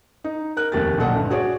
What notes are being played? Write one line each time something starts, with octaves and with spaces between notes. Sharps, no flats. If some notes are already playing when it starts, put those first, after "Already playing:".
D#4
A#4 F#6
F1 D#2 G4 A6
B1 A#2 A4 F#5
D2 G2
F#4 G#4 C#5 D5